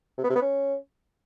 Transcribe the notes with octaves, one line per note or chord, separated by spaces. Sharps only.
C3
B3
C3
B3
C#4